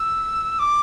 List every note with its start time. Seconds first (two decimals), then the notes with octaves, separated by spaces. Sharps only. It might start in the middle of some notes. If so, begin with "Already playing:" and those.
Already playing: E6
0.59 D6